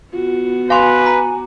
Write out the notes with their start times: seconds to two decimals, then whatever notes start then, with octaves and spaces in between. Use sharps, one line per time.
0.14 B3 F4 F#4
0.70 B4 F5 G#5 C6 D6
1.06 A#5